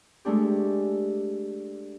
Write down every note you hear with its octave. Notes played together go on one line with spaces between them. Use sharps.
G#3 A3 D4 G4